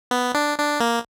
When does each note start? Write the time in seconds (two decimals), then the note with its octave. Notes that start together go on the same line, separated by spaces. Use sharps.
0.11 B3
0.34 D4
0.58 D4
0.80 A#3